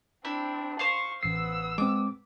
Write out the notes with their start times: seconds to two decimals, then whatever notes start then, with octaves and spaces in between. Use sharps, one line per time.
0.25 C4 D4 E4
0.79 C5 F5 C6 C#6
1.23 A1 B3 E6 C7
1.78 G#3 C4 D6